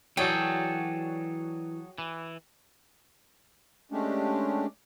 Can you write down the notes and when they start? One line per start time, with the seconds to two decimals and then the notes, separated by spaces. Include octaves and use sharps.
0.17 E3 F#3 F#4 G#4 A4 C#5 D5 G5
1.98 E3
3.92 G#3 A3 C#4 D4 G4